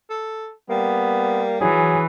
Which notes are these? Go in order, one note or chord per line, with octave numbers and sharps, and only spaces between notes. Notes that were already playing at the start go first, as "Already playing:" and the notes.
A4
G3 A#3 B3
E3 F#3 G#4